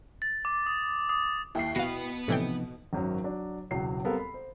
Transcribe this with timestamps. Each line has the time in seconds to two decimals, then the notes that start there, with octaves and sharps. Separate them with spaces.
0.22 A6
0.45 D6
0.66 D#6
1.09 D#6
1.55 D#2 E4 E5 G5 C7
1.76 B2 B3 F#4 F5 F#5
2.28 A2 C3 E3 F3 D#4 G5
2.93 G#1 F#2 D#3 F#3
3.24 F#3 D4
3.71 E1 C#2 F#3 C7
4.05 G3 B3 C4 A4 A#4 F5
4.18 B5
4.34 C5